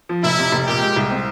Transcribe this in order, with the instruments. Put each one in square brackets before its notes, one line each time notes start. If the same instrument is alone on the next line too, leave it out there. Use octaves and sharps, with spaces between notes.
[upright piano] F3
[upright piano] F1 [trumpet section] E4
[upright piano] C3
F1
[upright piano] A#2 [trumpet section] G4
[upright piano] G#3
C2
C4